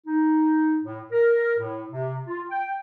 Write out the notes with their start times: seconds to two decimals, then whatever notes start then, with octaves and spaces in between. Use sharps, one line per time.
0.06 D#4
0.84 A2
1.12 A#4
1.59 A2
1.91 C3
2.27 F4
2.51 G5